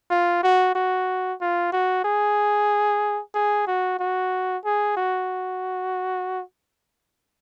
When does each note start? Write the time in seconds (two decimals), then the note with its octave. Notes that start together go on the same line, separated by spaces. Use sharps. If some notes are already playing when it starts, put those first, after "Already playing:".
0.11 F4
0.43 F#4
0.75 F#4
1.41 F4
1.73 F#4
2.05 G#4
3.35 G#4
3.67 F#4
3.99 F#4
4.65 G#4
4.97 F#4